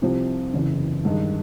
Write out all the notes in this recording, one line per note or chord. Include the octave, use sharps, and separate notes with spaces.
C2 C3 F3
F#1 E2 C#3
G2 D#3 G#3